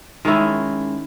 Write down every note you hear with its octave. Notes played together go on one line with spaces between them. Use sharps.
D#3 G#3 C#4 E4